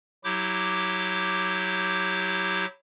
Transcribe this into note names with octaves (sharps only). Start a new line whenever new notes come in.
F#3 E4 G4 D6 G6